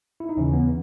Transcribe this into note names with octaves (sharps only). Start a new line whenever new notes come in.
E4
D#4
D#2 C#3 E3 C#4
B3